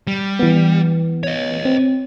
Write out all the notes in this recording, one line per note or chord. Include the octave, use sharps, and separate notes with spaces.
G3
E3 B3
C#5 D#5
C4